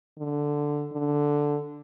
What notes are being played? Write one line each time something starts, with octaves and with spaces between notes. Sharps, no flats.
D3
D3